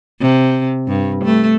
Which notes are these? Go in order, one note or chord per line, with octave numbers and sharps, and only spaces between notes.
C3
G2
A3